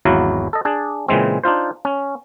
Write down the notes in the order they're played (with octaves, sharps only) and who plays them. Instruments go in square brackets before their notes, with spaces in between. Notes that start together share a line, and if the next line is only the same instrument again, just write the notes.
[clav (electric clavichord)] G#1 E2 F#3 E4 F#4 F5
A4 D#5
D4 G#4 D5
A#2 C#3 E3 G#3 C4
D4 D#4 F4 C5
C#4